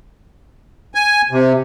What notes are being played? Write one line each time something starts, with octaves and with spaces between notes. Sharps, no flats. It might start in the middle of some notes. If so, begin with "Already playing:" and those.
G#5
C3